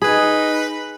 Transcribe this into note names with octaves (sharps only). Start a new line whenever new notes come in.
D#4 G#4 B4 B5